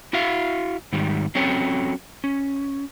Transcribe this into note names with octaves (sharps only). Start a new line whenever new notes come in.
E4 F#4 E5 F5
G#2 D#3 G3
F#3 C4 C#4 A4 C#5 G5
C#4